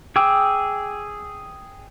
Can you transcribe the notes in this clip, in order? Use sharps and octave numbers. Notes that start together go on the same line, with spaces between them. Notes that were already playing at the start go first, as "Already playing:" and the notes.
G#4 G5 D6 E6